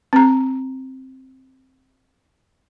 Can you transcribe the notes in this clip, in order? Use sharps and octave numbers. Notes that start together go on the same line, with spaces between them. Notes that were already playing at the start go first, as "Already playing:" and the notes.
C4 A#5